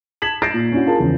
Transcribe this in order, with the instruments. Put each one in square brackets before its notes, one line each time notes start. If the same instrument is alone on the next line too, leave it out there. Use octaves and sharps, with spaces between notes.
[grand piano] A5 G#6 B6 E7 F#7
G6 A6 A#6 C7 D7 E7
A#2
C#4 D4 E4 F#4
F4 G#4 A#4 A5
E2 C#3 F3